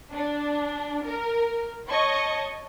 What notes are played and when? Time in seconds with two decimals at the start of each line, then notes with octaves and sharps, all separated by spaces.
0.13 D4
1.05 A#4
1.88 C#5 D#5 A5 C#6